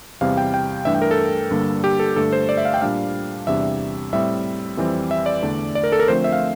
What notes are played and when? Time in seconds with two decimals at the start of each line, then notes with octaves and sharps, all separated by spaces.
0.21 E2 C3 G3 C4 F5
0.37 G5
0.54 G5
0.85 G2 E3 A3 D4 E5
0.95 G5
1.02 A#4
1.11 A4
1.51 G2 D3 G3 A#3 D4
1.84 G4
1.99 A4
2.16 G2 D3 A3 A4
2.33 C5
2.49 D5
2.57 E5
2.65 F5
2.74 G5
2.81 A#2 G3 D4 F5
3.47 E2 C3 G3 D4 E5
4.13 A2 G3 C4 E5
4.77 F2 E3 G3 C4
5.11 E5
5.26 D5
5.42 E2 D3 A3 D4
5.75 D5
5.83 A#4
5.92 A4
6.00 A#4
6.08 D3 F3 A3 C4 C5
6.24 E5
6.33 F5